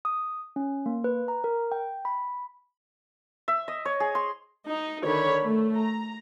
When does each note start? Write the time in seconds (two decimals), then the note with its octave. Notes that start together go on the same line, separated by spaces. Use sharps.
0.05 D#6
0.56 C#4
0.86 A#3
1.04 B4
1.28 A#5
1.44 A#4
1.72 G5
2.05 B5
3.48 E5
3.68 D#5
3.85 C#5
4.00 G#4
4.15 C6
4.68 D#4
5.04 D3 D#3 C#5 B5
5.44 A3
5.75 A#5